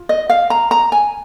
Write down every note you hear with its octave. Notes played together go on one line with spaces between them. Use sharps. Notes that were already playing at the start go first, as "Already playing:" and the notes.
Already playing: F4
D#5
F5
A#5
A#5
G#5